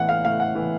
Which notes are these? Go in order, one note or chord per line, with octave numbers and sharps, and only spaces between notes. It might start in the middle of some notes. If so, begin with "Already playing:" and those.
Already playing: A2 E3 F#5
F5
A2 F5
F#5
E3